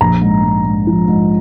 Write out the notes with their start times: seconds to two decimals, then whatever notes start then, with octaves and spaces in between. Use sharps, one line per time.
0.01 A#1 A#5
0.22 G#2
0.44 G#2
0.65 G#2
0.87 F3
1.08 G#2